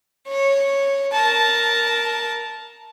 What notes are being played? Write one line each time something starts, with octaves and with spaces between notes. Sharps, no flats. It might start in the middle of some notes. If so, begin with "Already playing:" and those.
C#5
A#4 A5